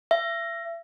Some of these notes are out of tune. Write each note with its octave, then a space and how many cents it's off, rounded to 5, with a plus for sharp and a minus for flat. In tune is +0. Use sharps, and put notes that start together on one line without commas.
E5 +35